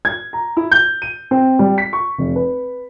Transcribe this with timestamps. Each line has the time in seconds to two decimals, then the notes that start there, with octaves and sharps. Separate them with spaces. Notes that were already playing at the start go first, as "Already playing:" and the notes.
0.05 G#6
0.33 A#5
0.57 E4
0.71 G6
1.02 D#7
1.31 C4
1.59 G3
1.78 B6
1.93 C#6
2.18 F1
2.36 B4